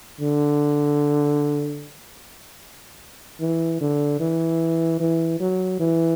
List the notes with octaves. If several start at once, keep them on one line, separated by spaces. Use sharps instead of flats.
D3
E3
D3
E3
E3
F#3
E3